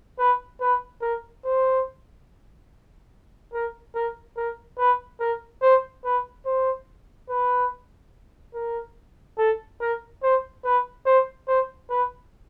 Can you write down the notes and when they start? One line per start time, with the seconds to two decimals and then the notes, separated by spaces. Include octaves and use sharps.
0.19 B4
0.61 B4
1.02 A#4
1.45 C5
3.53 A#4
3.95 A#4
4.37 A#4
4.78 B4
5.20 A#4
5.62 C5
6.05 B4
6.46 C5
7.30 B4
8.55 A#4
9.38 A4
9.81 A#4
10.23 C5
10.65 B4
11.06 C5
11.48 C5
11.90 B4